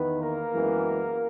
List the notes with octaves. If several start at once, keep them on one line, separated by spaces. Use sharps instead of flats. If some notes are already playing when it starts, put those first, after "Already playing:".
Already playing: E2 D#3 B3 B4
A#3 A#4
F#2 E3 G#3 B3